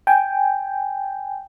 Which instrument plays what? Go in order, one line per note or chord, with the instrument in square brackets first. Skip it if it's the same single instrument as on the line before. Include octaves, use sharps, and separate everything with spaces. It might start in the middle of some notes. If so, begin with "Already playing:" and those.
[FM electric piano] G5 G#5